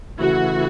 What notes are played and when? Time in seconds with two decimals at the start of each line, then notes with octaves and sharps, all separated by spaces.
0.18 C#3 E3 A3 E4 F#4